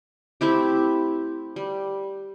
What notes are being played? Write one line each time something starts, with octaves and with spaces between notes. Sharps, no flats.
A3 C4 E4 G4
G3